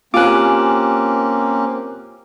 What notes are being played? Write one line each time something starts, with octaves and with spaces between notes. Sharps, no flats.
A#3 C4 C#4 F4 G4 G#5 D6 F#6